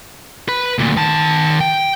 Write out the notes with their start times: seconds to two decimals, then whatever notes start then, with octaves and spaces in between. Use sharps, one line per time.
0.48 B4 B5
0.78 D2 A#2
0.97 D#3 A5
1.61 G5